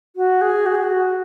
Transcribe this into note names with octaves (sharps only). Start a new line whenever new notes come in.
F#4
G#4
F#4
G#4
F#4